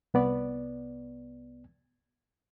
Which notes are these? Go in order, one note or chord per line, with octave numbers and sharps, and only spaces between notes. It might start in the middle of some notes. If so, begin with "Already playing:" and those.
C2 B3 D5